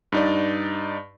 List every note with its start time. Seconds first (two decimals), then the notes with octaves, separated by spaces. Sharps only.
0.12 G2 D#4 D5